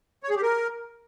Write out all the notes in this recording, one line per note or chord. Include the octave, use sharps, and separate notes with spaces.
C#5
G#4
G4
A#4